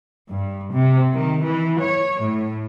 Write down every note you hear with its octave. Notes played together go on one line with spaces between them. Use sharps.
G2
C3
D#3
E3
C#5
A2